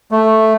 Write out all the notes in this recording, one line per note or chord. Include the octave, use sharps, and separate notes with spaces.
A3